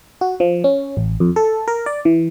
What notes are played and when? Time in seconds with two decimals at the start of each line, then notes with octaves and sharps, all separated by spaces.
0.21 F#4
0.40 F3
0.64 C#4
0.97 A1
1.20 F2
1.36 A4
1.68 A#4
1.86 D5
2.05 E3